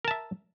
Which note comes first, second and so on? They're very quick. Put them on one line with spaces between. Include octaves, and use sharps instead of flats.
A#4 A5 E5